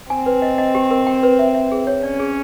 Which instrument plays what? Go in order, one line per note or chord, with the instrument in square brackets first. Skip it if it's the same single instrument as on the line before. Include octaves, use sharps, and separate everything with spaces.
[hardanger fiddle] C4 [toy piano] G#5
[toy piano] B4
D#5
D#5
G4
A#4
G5
B4
E5
E5
G#4
C#5
[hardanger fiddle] C#4 [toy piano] D5
[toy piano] G#4